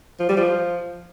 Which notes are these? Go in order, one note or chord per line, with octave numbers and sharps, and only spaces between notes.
F3
G3
F3